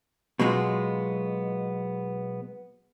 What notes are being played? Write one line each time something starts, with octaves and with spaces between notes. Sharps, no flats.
B2 F#3 G#3 B3 F4